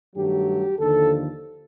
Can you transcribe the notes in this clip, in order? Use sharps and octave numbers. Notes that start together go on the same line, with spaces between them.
G2 D#3 F#3 A3 G4
D#2 D3 F3 A4